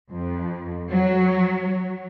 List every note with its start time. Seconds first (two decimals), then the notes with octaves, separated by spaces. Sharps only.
0.11 F2
0.90 F#3